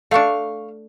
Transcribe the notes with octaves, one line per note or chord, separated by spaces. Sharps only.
A3 D4 F5 C#6